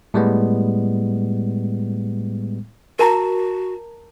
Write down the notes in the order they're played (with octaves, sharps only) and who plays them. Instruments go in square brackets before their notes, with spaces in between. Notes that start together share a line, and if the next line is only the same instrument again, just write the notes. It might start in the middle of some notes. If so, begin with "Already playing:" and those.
[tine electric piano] A2 G3 G#3 B3
[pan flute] F#4 [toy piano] A#4 A5 A#5